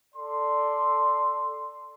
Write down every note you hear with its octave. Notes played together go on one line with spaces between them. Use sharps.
A4 D5 C6